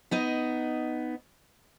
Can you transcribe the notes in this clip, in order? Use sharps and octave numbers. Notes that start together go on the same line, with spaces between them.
B3 D#4 D#5